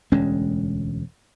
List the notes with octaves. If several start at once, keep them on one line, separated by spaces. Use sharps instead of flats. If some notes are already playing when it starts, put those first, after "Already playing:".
E1 D2 G#3 C#4